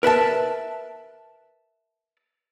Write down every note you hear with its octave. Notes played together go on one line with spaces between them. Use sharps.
A#4 B4 E5 A5